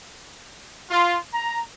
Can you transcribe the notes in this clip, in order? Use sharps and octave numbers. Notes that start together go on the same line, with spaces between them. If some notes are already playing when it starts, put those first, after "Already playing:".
F4
A#5